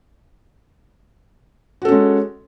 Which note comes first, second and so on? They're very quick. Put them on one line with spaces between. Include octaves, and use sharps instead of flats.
F#4 A4 C#4 G#3